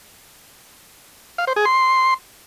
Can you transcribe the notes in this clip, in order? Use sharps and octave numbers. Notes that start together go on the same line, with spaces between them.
F5
C5
G#4
C6